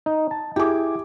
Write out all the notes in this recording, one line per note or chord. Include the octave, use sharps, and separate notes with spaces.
D#4
A5
E4 G4 G#4 D6